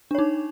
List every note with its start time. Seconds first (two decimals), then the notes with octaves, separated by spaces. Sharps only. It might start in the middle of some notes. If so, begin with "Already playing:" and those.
0.11 D4
0.15 C#5
0.19 D#4